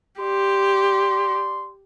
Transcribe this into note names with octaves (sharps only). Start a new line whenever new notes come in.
G4 D5 C6